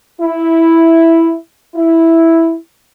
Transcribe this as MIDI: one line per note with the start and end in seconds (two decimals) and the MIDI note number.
0.20 1.35 64
1.75 2.56 64